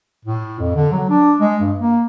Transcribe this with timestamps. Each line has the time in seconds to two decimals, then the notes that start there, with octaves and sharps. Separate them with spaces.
0.25 A2
0.59 F2
0.76 D3
0.92 F#3
1.09 D4
1.39 G#3
1.61 G2
1.79 A#3